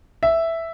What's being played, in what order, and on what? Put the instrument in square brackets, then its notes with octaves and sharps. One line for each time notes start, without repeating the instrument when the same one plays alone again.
[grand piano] E5